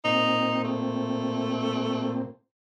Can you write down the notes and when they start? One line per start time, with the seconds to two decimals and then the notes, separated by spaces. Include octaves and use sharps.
0.04 A#2 C4 D#4
0.64 A3